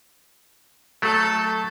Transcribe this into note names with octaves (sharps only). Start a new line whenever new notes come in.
F#3 A3 A4 A5